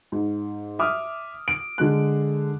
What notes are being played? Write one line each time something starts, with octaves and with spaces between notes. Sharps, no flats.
G#2
E5 D6 D#6 F6
D7
D3 G#3 F#6